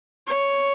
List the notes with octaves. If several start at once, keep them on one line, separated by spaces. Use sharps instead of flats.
C#5